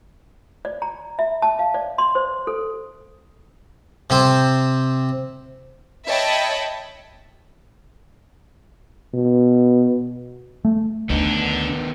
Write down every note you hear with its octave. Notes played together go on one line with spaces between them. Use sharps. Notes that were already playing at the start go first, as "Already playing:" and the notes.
D5
A#5
E5
A5
F5
D5
C6
C5
A4
C3 C4
C#5 D#5 E5 G5 A5 B5
B2
A3
D2 D3 D#3 B3 D4 D#4